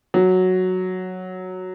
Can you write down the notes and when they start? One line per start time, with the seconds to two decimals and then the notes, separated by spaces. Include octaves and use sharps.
0.14 F#3